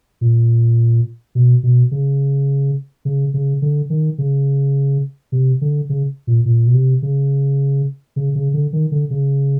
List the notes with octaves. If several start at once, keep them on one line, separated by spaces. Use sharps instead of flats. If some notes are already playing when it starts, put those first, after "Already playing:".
A#2
B2
B2
C#3
C#3
C#3
D3
D#3
C#3
C3
D3
C#3
A#2
A#2
B2
C3
C#3
C#3
C#3
D3
D#3
D3
C#3